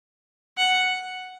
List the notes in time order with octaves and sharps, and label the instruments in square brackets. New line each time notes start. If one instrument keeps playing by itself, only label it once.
[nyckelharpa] F#5